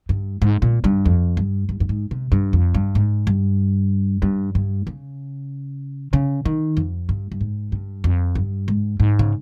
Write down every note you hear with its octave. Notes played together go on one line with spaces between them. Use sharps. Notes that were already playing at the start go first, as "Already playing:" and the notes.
G2
G#2
A#2
G2
F2
G2
G2
G2
G#2
C3
G2
F2
G2
G#2
G2
G2
G2
C#3
C#3
D#3
F2
G2
G2
G#2
G2
F2
G2
G#2
G#2
C#3